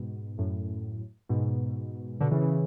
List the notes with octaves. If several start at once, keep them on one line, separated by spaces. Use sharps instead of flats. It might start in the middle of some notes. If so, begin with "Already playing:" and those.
Already playing: G#2 B2
F#2 A2
G#2 B2
B2 D3
C#3 E3
C#3 E3